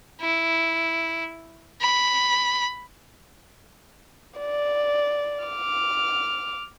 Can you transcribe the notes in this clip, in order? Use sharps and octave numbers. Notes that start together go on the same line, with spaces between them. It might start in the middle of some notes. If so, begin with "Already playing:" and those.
E4
B5
D5
D6 F6